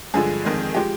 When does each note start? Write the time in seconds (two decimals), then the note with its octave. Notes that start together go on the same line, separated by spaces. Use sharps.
0.14 G2 D3 F3 G#3 G#4
0.45 F2 D#3 G#3
0.75 F3 G#3 G4